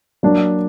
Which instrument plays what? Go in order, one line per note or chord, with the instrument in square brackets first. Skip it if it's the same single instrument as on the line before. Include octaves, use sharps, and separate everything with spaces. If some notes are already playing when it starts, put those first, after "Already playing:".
[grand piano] F#3 A#3 D4